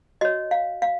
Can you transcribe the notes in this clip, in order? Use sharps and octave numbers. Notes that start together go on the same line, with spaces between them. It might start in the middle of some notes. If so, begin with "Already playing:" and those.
F#4 C#5 D#5
F5
F5